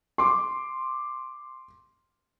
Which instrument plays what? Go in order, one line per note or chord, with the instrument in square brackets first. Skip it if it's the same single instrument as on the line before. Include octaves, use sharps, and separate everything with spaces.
[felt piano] C6 D6